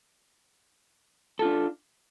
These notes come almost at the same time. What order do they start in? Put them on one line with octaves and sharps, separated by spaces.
A4 F4 D4